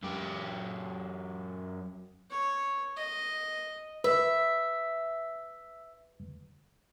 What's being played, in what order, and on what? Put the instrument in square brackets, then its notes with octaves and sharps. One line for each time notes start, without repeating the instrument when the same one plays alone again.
[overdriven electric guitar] F#2 G4
[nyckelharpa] C#5
D#5
[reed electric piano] B4 [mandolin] E5